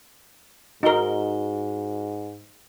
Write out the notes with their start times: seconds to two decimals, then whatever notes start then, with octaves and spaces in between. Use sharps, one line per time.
0.83 G#2 D#4 F#4 A#4 D#5 G7